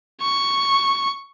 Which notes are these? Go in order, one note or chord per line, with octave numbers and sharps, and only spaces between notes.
C#6